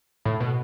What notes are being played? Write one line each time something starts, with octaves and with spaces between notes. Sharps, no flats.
A2
B2